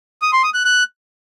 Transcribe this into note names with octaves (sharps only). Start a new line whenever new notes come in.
D#6
C6
D#6
F#6
F#6